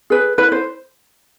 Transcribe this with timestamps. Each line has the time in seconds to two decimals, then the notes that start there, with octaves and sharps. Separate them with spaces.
0.10 G#4 B4
0.38 E4 B4
0.52 C5